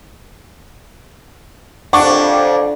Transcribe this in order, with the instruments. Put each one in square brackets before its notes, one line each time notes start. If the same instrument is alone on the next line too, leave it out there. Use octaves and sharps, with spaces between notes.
[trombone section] C2 F2 [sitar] D4 [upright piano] F#5 C#6 D6